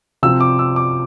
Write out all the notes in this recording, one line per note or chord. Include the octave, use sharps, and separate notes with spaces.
C3 F3 C4 E6
D6
E6
D6